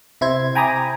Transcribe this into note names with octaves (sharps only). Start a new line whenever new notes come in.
C3 E4 C5 G#6
G5 G#5 A#5 B5 D6 D#6